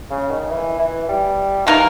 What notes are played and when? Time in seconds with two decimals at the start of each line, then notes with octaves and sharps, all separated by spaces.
0.11 C#3
0.30 D#3
0.50 E3
0.79 E3
1.08 G3
1.67 D#3 E3 A#3 D#4 A#4